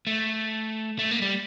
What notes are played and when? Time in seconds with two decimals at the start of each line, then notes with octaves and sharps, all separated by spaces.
0.07 A3
0.99 A3
1.11 A#3
1.22 G3